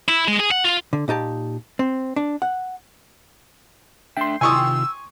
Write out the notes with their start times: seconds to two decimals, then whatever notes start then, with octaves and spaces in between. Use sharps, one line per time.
0.08 E4
0.28 G#3
0.40 G#4
0.51 F#5
0.64 F4
0.93 D3
1.08 A#2 D#4 G4 A5
1.79 C4
2.16 D4
2.42 F#5
4.17 A3 D4 E5 G5 C6
4.41 C3 D#3 F4 G#5 C#6 D#6 E6